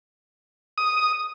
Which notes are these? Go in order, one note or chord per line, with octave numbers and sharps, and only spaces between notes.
D#6